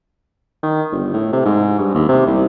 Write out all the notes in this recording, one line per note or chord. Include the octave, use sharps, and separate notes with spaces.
D#3
G1
A2
C3
G#2
G2
D#2
C3
C2